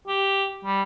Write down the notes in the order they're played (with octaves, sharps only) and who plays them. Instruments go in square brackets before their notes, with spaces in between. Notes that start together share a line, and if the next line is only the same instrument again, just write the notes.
[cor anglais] G4
G3